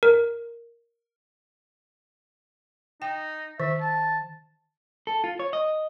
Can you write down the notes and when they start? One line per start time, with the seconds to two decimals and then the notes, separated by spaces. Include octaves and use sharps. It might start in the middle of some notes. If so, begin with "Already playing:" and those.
0.03 A#4
3.02 D#4 G5
3.60 D#3 E5
3.81 A5
5.07 A4
5.24 F4
5.40 C#5
5.53 D#5